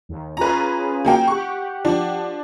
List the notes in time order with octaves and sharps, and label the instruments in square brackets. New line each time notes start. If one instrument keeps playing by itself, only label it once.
[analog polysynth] D#2
[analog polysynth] C#4 F4 G#4 [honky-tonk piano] B4 A#5
[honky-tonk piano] F#3 A#3 G5
[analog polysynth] G4 F#5 [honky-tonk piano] C#6
[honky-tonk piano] F3 D4